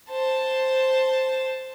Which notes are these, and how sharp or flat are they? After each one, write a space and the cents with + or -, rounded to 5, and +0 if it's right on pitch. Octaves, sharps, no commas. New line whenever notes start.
C5 +0 A5 +0